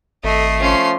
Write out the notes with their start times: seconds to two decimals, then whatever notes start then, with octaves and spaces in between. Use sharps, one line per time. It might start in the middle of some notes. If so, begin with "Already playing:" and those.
0.24 G#1 A3 A4 D#5 C7
0.60 F3 C#4 C6